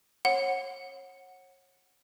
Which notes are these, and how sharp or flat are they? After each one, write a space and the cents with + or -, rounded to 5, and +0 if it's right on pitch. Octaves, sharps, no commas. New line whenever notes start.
C#5 -35 F#5 +0